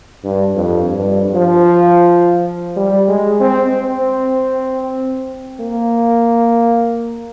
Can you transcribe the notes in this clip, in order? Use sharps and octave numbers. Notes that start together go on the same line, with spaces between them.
G2
F2
G2
F3
G3
G#3
C4
C4
A#3